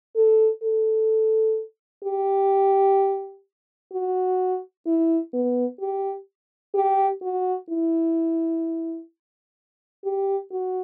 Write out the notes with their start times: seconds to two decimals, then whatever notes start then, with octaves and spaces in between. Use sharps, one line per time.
0.16 A4
0.63 A4
2.04 G4
3.93 F#4
4.87 E4
5.34 B3
5.81 G4
6.75 G4
7.22 F#4
7.70 E4
10.05 G4
10.52 F#4